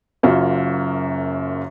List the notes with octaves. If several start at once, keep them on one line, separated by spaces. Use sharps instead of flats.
F#1 F#2 F4 F#4